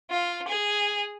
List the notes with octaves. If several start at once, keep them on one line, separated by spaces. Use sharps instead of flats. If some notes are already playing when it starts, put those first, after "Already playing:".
F4
G#4